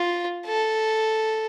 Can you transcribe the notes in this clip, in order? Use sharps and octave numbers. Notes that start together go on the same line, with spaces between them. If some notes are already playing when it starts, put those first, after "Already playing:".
Already playing: F4
A4